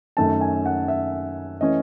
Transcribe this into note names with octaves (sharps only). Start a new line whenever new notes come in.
F#2 D#3 A3 C#4 A5
G#5
F#5
E5
E3 A3 C#4 D#5